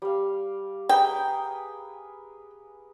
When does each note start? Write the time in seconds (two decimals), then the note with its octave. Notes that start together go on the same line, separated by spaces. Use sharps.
0.02 G3 F5
0.89 G#4 A#4 B4 G5